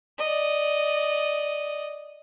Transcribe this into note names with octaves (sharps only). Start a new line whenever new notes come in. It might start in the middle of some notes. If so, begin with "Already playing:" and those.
D5 D#5